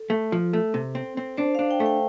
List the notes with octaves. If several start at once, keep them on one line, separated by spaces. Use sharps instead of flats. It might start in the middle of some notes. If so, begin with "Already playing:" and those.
Already playing: A4
A3
F3
A3
C3
C4
C4
D4 C5
D4 F5
G5
A3
G5